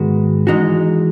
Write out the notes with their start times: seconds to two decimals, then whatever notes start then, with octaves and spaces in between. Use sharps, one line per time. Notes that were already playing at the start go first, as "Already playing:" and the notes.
Already playing: G#2 D#3 G#3 B3 F#4
0.47 E3 G#3 D#4 F#4